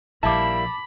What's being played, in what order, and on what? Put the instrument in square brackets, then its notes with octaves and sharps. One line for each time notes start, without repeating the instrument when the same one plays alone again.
[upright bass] A#1 F3 [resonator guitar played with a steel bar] G3 A#3 E4 [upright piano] A5 D6 [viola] B5